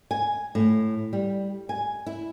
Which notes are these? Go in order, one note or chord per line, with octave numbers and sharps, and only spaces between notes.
G#5
A2
G3
G#5
E4